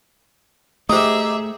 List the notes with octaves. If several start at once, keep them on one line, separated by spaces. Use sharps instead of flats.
A3 D#4 G4 G#4 C5 E5 D#6